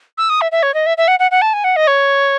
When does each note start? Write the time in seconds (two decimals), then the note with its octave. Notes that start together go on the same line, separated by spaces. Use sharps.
0.18 E6
0.29 D#6
0.41 E5
0.52 E5
0.63 C#5
0.74 D#5
0.86 E5
0.97 E5
1.08 F#5
1.19 F#5
1.31 F#5
1.42 A5
1.53 G#5
1.64 F#5
1.76 D#5
1.87 C#5